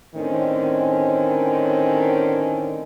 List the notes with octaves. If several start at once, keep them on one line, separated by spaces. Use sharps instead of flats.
A2 D3 D#3 C4 C#4